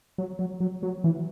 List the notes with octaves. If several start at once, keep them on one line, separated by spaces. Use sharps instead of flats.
F#3
F#3
F#3
F#3
E3